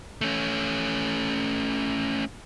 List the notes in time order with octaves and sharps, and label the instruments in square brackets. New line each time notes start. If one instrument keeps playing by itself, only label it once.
[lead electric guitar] A3 C#4